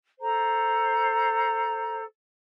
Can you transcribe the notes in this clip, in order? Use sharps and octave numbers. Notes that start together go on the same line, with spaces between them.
A4 C5 A#5